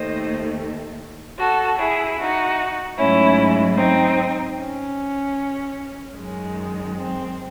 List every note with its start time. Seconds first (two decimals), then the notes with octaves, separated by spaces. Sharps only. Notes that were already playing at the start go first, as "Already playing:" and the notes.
Already playing: D#2 D#3 A3 C5 D#5
1.38 F#4 A4
1.79 E4 G#4
2.18 D#4 F#4
2.97 G#2 F#3 A3 C#4 E4
3.76 C4 D#4
4.57 C#4
6.15 F#2 D#3 G#3
6.94 C4